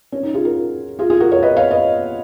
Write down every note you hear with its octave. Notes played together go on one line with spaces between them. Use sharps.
C#4
D#4
F4 G#4
F#4 A#4
F4 G#4
F4 G#4
F#4 A#4
A#4 C#5
B4 D#5
C#5 F5
B4 D#5